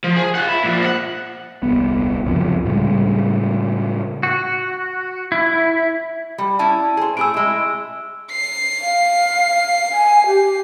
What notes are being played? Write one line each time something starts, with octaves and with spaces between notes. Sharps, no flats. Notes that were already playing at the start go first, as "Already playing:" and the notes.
F3
G#4
F4 F#5
E4
A#2 F3
D#5 F#5
D#1 C2 B3
C#2 F#2 C3 F3
A2 C#3 G3 G#3
F#4
E4
G3
C#4 E4 D5 A5
G#4 C5
A2 G#4 E6 D7
G#3 E4
C7
F5
G#5
G4